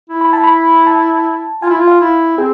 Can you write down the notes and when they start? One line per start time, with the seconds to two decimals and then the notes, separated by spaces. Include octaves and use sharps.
0.09 E4
0.21 B5
0.33 A5
0.44 B5
0.87 A5
1.62 F4 G#5
1.70 E4
1.77 F4
1.87 F5
2.00 E4
2.38 C4 G#4